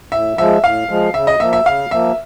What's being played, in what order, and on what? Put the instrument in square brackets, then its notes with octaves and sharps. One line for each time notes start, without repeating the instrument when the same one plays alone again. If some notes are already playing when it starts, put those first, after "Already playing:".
[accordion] A2 [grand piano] E5
[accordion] F3 G#3 [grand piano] E5
[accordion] A2 [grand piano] F5
[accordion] F3 G#3
[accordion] C#3 [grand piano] E5
[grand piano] D#5
[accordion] F3 A#3 [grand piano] E5
[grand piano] E5
[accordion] C#3 [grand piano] F5
[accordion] F3 A#3 [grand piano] E5